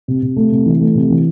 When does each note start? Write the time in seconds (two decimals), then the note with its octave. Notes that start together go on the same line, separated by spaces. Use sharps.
0.08 C3
0.22 C3
0.37 A3
0.51 C3
0.66 E3
0.81 A3
0.95 C3
1.10 E3